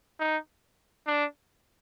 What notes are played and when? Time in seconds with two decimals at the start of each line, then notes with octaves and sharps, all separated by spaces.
0.19 D#4
1.07 D4